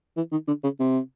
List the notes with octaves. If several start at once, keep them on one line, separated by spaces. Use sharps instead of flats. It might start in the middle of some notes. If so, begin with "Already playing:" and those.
E3
D#3
D3
C#3
C3